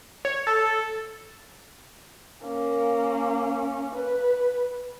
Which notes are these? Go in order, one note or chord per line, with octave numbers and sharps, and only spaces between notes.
C#5
A4
A#3 C#4
B4